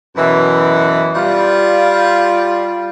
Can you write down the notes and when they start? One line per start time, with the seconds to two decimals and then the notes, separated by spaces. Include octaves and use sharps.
0.16 F#2 B2 E3
1.15 G3 F4